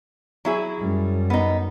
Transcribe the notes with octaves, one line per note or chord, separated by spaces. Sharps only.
F#3 E4 G#4
F#2 G3
B3 D#4